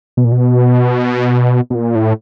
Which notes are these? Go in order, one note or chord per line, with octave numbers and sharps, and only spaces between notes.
B2
A#2
B2
B2
A#2
A2